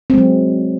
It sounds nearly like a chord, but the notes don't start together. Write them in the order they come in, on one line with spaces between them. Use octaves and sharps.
C4 G#3 F#3